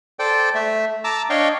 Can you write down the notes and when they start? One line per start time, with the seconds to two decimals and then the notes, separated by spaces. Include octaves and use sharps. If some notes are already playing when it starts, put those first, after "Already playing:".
0.19 A4 C5 D5 G5
0.55 A3 E5
1.04 A5 A#5 D6 E6
1.30 D4 C#5 D#5 F5 G5 C#6